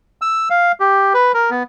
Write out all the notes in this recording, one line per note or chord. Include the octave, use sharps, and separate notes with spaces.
E6
F5
G4
B4
A#4
B3